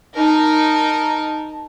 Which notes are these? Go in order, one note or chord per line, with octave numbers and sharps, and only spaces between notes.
D#4 A#4 A5